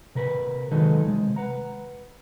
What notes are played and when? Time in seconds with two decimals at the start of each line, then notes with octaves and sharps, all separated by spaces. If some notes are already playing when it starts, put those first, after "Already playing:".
0.15 C3 A#4 B4
0.72 D#3 F#3 G#3 D#4 A4 B4
1.07 C3 G#3
1.36 B4 F#5 A#5